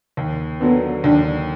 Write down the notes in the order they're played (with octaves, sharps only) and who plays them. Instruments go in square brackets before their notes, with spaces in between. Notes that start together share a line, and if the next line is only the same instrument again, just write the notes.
[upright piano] D#2
[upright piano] D3 F#3 [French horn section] B3
[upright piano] D#2 [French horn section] D4